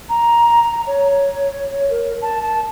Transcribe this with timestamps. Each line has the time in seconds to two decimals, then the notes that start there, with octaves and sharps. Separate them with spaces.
0.09 A#5
0.63 A#5
0.87 C#5
1.90 A#4
2.22 A5
2.42 A5